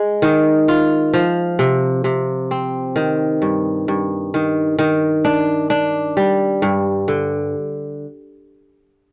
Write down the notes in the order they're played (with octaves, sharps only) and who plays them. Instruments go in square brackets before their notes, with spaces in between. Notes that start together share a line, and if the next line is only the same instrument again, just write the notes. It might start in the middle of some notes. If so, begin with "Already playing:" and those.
Already playing: [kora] G#3
D#3
F4
F3
C3
C3
C4
D#3
G2
G2
D#3
D#3
D4
D4
G3
G2
D3